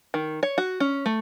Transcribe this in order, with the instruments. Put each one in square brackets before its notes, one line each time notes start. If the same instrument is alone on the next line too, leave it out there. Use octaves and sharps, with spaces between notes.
[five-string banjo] D#3
C#5
F#4
C#4
A3